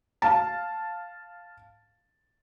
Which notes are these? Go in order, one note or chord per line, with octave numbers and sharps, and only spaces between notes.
F5 A5